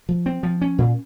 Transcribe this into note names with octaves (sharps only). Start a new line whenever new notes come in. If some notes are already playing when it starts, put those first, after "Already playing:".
F3
C4
F3
C#4
A#2